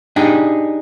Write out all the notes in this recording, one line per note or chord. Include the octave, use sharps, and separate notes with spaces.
D4 D#4 G4 G#4